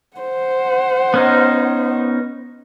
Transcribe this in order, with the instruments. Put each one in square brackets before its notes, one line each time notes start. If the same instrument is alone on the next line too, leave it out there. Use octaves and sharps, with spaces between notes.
[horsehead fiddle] C5 F#5
[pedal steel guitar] B3 C#4 D#4